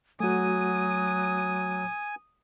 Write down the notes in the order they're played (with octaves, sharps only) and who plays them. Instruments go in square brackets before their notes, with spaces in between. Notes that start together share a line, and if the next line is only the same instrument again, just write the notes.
[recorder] F#3 [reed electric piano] A3 F#4 [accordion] G#5 [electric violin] D#6